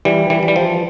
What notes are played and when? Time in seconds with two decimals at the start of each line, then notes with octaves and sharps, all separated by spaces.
0.05 E3 G3
0.30 E3 G3
0.43 E3
0.48 G3
0.56 F3